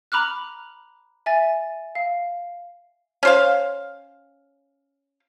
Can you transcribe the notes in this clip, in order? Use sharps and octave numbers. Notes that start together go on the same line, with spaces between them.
A#5 B5 D6 F6 F#6
E5 G#5 A6
F5
C#4 C5 F5